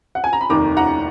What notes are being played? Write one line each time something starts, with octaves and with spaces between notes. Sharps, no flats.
F#5
G#5
A#5
B5
F1 D#2 D#3 A#5 D6
F#5 A#5